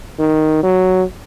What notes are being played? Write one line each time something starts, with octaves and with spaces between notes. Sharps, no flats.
D#3
F#3